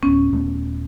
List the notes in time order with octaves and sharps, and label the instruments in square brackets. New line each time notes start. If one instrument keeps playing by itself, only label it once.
[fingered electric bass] D1 B3 [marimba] C#4
[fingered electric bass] D#1 A3 B3